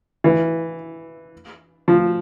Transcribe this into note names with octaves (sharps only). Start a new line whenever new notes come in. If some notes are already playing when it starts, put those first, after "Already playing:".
E3
F3